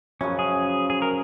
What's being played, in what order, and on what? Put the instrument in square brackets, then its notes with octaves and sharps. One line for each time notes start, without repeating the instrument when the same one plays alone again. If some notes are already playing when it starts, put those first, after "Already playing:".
[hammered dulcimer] F#2 C#3 F3 [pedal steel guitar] C#4
[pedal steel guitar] G#4
G#4
A#4